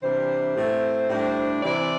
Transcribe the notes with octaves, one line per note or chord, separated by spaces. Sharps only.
C3 E3 G3 D4 C5
A2 A3 C4
A2 G3 D4
C3 E3 C4 E4 D5